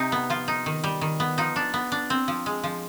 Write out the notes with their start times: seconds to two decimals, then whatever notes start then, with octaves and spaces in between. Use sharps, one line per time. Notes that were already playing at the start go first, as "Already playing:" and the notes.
Already playing: C3 D#4
0.12 B3
0.30 F3 F4
0.48 D#4
0.66 D#3
0.84 G3
1.01 D#3
1.20 B3
1.38 F3 D#4
1.56 D4
1.74 B3
1.92 D4
2.10 C4
2.28 F3
2.46 G#3
2.64 F3